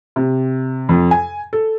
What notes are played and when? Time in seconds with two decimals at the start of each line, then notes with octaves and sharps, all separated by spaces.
0.16 C3
0.89 F2
1.11 G#5
1.53 A4